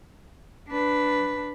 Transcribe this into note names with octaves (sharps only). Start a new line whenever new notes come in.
D4 B4